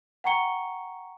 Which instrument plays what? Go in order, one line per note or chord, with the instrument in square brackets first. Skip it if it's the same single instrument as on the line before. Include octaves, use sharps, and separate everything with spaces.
[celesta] F#5 G5 A#5 C#6 C#7 G7